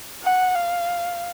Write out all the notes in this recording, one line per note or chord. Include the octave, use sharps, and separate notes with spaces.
F#5
F5